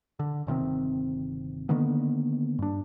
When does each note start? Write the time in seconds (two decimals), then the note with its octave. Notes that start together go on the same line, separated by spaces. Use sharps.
0.19 D3
0.47 G1 C3 D#3 C4
1.69 D3 D#3 A#3 B3
2.59 G2 D4